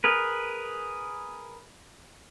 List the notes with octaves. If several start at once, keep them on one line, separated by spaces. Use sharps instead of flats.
G#4 A#4 B4